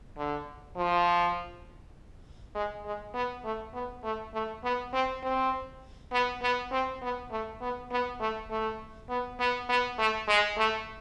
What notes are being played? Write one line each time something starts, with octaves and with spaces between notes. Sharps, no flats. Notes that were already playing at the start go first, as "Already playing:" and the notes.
D3
F3
G#3
G#3
B3
A3
B3
A3
A3
B3
C4
C4
B3
B3
C4
B3
A3
B3
B3
A3
A3
B3
B3
B3
A3
G#3
A3